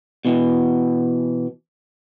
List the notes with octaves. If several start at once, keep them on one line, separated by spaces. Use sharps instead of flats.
B2 E3